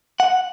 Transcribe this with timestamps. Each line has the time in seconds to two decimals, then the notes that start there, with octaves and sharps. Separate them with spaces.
0.20 F#5